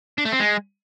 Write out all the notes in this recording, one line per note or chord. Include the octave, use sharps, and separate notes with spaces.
D4
A3
C4
G#3